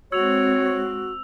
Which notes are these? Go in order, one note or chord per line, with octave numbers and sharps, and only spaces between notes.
G#3 C4 F#4 C#5 E6 F7